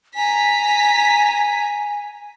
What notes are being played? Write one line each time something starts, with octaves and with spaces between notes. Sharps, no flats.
G#5 A#5 B6